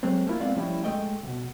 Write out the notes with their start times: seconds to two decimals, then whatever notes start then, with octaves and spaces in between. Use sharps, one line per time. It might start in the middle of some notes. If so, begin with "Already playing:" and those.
0.03 F#3 G#3 A3 C4
0.27 A3 A#3 E4 F4
0.40 G#3 B3 C4 D5 F5
0.55 A2 F3 G3 C#4 E4
0.84 G#3 A3 D#5 G5
1.23 C#2 B2